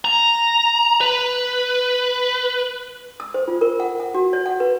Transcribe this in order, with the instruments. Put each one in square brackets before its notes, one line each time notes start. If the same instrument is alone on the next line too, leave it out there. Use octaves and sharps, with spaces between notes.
[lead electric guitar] A#5
B4
[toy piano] E6
C5
F4
A#4
F#5
F#5
F#4
C#5
F#5
B4